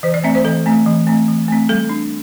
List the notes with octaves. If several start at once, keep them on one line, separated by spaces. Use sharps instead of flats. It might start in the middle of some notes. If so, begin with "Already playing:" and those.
E3 C5
D5
A3 C4 E5
C5
E3 A4
A3 C4
E3
A3 C4
E3
A3 C4
G3 A4
D4